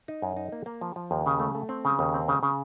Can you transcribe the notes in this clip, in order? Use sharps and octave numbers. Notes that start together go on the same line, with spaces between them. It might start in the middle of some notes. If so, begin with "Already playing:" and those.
D#4
F#2
D#4
A#3
A#3
F3
F3
D#2
C#3
A3
A3
C4
C#3
D#2
C4
C#3
C#3